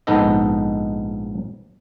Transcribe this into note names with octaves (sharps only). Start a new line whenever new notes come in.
A#1 G#2 B3 D#4 A4 D#5